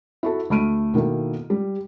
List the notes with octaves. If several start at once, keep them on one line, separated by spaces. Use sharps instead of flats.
E4 F#4 A4
D2 A3 B5 F6 D7 D#7
B2 D#3 A#3 E4 A4
G3